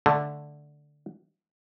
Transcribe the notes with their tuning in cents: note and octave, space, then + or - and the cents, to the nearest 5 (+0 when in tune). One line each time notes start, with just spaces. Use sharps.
D3 +0 A3 +0